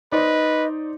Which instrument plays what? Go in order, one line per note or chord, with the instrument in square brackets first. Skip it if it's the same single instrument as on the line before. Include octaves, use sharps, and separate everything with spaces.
[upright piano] D#4 C5 D5 [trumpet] B4 [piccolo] D#5